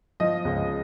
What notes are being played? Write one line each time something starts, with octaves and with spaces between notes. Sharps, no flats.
F3 D#5
C#2